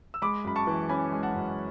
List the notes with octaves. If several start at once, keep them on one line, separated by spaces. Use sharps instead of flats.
E6
G#3 B5 D6
F#2 B5
A5 C#6
E3
C#4 G#5 B5
G#3
F#5 A5
F#2